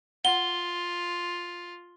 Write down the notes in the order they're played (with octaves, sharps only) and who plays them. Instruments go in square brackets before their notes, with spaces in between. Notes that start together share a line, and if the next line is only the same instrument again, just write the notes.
[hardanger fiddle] F4 [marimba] F#5 [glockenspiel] G7